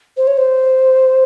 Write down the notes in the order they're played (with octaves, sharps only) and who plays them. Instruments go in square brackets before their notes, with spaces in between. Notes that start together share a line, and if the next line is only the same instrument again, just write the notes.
[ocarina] C5
C#5
C5